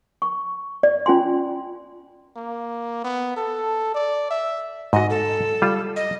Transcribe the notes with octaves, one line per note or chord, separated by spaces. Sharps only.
C#6
D5
C#4 F4 G#5 C6
A#3
B3
A4
D5
E5
G#2 F#4 D#5
A4
G3 F4
D#5